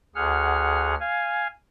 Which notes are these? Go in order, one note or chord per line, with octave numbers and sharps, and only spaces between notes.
D2 G#4 F#5 F6
F5 G#5